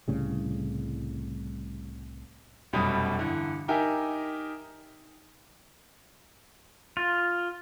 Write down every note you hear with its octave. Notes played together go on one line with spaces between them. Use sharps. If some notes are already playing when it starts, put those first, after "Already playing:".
C2 A2 C#3 G3
F1 F#2 B2 G3 B5 D#6
G2 D3 E3
D#4 G4 A#4 E5 G#5
F4